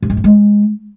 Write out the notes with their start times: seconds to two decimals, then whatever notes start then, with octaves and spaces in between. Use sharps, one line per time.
0.03 G2
0.10 G#2
0.17 G2
0.24 G#3